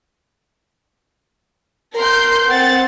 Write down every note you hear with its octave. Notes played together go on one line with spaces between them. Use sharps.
A#4 C6 G6
C4 F#5 A6